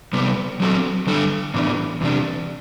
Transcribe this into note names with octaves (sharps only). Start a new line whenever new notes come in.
C3 G3 B3
F#3 C4 F#4 A4
D3 G3 D4 A4
A2 E3 B3 D4
E2 C3 G3 D4